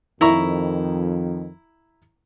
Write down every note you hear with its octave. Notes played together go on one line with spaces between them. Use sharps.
F2 D#3 E4 A#5 C#6